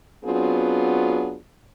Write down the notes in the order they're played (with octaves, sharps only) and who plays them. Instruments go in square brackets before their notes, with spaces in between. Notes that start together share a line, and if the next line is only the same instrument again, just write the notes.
[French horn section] F#3 B3 C4 D4 F4 G#4